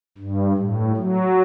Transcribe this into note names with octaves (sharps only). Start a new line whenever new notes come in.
G2
A2
F#3